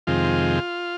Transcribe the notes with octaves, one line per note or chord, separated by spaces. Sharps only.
F2 C3 D#3 G#3 F4